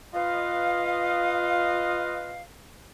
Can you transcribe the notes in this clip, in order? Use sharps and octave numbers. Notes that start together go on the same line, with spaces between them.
F4 B4 D#5 F5